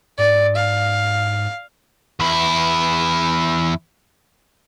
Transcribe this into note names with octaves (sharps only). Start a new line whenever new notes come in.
G#2 D5
F5
E2 E4